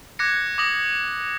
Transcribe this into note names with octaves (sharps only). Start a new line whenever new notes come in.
D6 F#6 G#6 A#6 C#7
D6 D#6 A#6 F#7